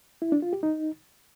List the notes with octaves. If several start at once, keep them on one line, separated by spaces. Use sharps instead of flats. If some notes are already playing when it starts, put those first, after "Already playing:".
E4
D4
F4
G4
D#4